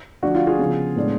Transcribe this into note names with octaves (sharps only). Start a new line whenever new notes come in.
D3 F3 A3 D4 F#4
F4
F4 G#4
C#3 F3 B3
A2 G#3 B3 D4